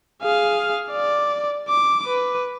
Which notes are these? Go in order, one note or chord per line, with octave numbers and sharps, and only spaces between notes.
G#4 F5
D5
D6
B4